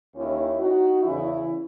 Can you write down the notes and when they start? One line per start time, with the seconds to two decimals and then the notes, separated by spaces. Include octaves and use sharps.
0.16 D#2 D#3 C#4 E4
0.60 D#4 F#4
1.03 E2 C#3 E3 C#4 E4